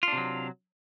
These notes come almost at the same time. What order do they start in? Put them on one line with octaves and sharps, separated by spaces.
F4 D4 C3 F#3